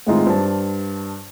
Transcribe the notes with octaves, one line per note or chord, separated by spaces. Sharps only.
A2 D#3 G#3 C4 D#4 F4
G2 C5 A5